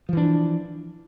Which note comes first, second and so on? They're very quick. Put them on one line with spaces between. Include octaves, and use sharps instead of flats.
F3 E3 D4